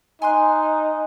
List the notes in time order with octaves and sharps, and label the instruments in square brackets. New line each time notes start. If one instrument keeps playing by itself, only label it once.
[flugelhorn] D#4 [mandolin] G#5 C6 F#6